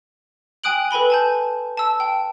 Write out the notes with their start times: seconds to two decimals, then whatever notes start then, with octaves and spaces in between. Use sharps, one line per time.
0.64 G5 G#5 D#6 F#6 D7 F#7
0.91 A4 B4 G#5 B5 G7
1.10 G#5 A5 G6
1.77 A5 E6
2.00 G5